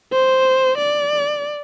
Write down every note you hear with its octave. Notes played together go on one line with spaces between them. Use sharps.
C5
D5